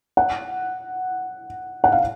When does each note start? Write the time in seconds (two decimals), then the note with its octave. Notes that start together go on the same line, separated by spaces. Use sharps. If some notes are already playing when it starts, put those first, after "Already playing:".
0.17 F#5
1.84 F#5
1.92 F5